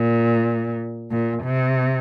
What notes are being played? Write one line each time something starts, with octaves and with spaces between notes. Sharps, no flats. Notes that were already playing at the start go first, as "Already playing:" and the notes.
Already playing: A#2
A#2
C3